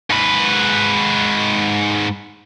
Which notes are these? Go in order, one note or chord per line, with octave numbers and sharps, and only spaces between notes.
G#2 B4